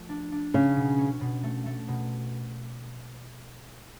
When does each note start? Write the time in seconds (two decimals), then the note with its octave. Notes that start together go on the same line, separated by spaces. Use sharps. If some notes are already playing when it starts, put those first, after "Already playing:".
Already playing: F3 A3
0.09 D4
0.32 D4
0.54 C#3 C#4
0.76 B2
0.99 C#4
1.21 B2
1.43 A3
1.66 A3
1.88 B2